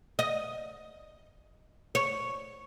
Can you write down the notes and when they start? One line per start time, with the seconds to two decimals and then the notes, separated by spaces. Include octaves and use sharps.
0.19 D#5
1.95 C#5